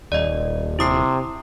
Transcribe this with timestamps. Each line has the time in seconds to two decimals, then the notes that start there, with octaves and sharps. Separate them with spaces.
0.12 D#1 D5 D#5
0.79 C3 E4 D#6 C7